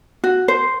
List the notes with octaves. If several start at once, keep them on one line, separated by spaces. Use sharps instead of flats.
F#4
C5